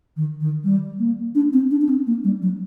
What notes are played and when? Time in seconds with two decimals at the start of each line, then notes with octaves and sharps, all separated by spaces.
0.17 D#3
0.41 D#3
0.64 G3
0.99 A#3
1.35 D4
1.53 C4
1.71 D4
1.82 D4
1.89 C4
2.07 A#3
2.24 G3
2.42 F#3